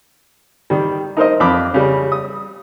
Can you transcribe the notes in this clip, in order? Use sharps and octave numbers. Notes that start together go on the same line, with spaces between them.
D#3 G3
D#4 A#4 C5 D#5
F2 B5 D6
C#3 G3
D#6